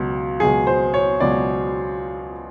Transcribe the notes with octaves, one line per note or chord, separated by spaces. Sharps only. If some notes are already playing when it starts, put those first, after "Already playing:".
Already playing: C#2 B2 F#3
C#2 B2 F#3 G#4
C5
C#5
C#2 B2 F#3 D5